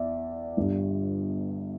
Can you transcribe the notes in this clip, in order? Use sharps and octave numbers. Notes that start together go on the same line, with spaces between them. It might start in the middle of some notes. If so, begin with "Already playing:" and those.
Already playing: E2 D5 E5
G1 G2 D3 G3